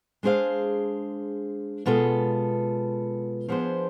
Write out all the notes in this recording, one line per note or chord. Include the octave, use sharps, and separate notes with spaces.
G#3 D4 G#4 C5 F5
B2 G#3 B3 F4 A4
F3 B3 D4 G#4 C5